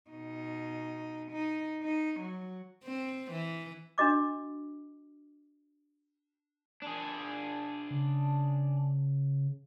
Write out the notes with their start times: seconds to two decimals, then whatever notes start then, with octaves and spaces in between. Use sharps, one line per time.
0.10 B2 D#4
1.31 D#4
1.83 D#4
2.20 F#3
2.84 C4
3.31 E3
3.98 D4 F#4 D#5 D6
6.82 D4 G#4
7.90 C#3